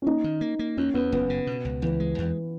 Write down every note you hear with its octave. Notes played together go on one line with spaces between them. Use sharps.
C#4
A#3 D#4
D#3
A#3
A#3
E2 C#4
E2 B3
F#1 B3
C#3
B2
C#2
C#2 E3
G#3
E2